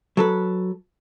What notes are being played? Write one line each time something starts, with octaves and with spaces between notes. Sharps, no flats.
F#3 A4 B4